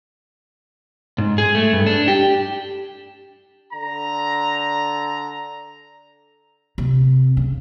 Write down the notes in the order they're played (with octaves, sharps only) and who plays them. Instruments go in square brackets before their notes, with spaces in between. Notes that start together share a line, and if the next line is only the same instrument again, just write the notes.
[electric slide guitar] G#2
G#4
A3
G2
D4
G4
[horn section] D3 A#5
[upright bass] C3
C#3